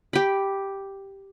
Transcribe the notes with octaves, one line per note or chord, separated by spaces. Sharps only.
G4 B5